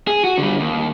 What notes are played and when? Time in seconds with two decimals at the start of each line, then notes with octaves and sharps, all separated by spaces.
0.07 G#4
0.24 F#4
0.38 D3 G3
0.60 D#2